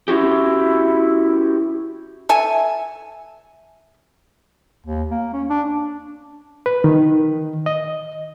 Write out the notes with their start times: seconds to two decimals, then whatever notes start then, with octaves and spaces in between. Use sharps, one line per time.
0.08 C#4 E4 F#4 G4
2.29 A4 E5 G#5
4.87 D#2
5.11 A#3
5.33 C#4
5.50 D4
6.66 B4
6.84 D#3
7.66 D#5